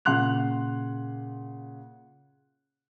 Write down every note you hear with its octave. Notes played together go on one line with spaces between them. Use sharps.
A#2 C#3 F#5 C6 F#6 F7